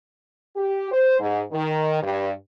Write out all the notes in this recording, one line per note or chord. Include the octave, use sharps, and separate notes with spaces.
G4
C5
G#2
D#3
G2